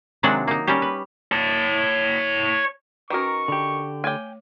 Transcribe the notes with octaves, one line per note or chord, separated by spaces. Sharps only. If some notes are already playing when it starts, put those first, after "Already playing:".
C3 D#3 F#3 G#3 D4 F#5
A#3 D#4
G3 A#3 C#4 G4
B4
C#5 A5
D#3 C#4 F#4 A#4 B4 C#6
D3 G4
A3 C#5 G5 G#5 D6